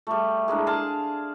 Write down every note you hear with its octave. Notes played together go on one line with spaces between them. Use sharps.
G3 A3
G#3 A#3 D4 E4
G#4 F5 A5 C6